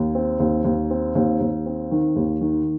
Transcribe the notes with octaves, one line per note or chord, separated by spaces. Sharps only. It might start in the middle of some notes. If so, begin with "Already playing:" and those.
Already playing: D#2
C4
D#2
D#2
C4
D#2
D#2
C4
D#3
D#2
D#3